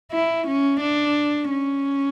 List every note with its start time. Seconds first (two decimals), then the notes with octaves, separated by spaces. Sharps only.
0.12 E4
0.47 C#4
0.81 D4
1.50 C#4